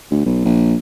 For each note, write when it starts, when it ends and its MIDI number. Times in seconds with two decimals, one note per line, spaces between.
0.11 0.25 38
0.26 0.45 35
0.45 0.75 34